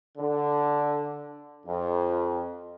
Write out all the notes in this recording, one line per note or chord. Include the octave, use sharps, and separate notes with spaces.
D3
F2